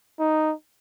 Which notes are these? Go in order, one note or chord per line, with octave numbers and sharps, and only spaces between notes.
D#4